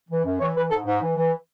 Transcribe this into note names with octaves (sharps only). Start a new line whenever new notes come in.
E3
F#2
E3 C#5
E3 B4
G#2 A4
G#2
E3
E3